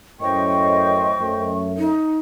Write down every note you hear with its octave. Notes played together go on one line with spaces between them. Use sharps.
F#2 A2 C5 D#5 G5 C#6
F#2 A3
D#4